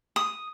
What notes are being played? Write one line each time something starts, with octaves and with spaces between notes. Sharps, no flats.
D#6